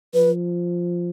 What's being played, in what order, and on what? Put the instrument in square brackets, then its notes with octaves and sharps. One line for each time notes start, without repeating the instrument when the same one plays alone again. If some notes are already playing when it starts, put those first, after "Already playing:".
[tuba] F3 [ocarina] B4